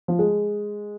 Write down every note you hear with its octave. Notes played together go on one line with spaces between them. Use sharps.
F3
G#3